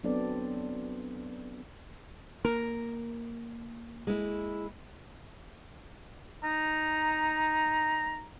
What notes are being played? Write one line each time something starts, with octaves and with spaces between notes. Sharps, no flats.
F#3 B3 C4 D4 A4 D5
A#3 A#4
G#3 E4
D#4 A#5